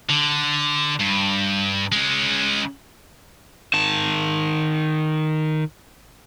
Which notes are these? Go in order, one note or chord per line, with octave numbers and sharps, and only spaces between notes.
D3
G2
G#3 C#4
D#3 A5